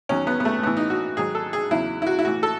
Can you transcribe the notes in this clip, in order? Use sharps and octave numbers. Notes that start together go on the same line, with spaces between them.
E2 D#3 F#3 C#4
B3
B3
A3
A2 E3 B3
D#4
F#4
G#2 D#3 F#3 G#4
A4
G#4
E2 C#3 F#3 E4
E4
F#4
E4
A2 E3 F#4
A4